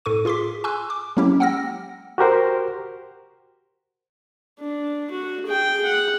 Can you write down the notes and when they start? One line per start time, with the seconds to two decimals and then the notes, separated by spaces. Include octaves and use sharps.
0.05 A2 A4 C#6 D#7
0.25 F4 G#4 C6 D6 B6
0.64 G#5 C6 C#6 E6 F#6
0.90 D6
1.17 F#3 G#3 A#3 C#4 E4 G4
1.40 F#5 G5 E6 F6 A#6
2.18 F#4 G4 A#4 C5
4.59 D4
5.11 F#4
5.46 G#4 G5
5.86 F#5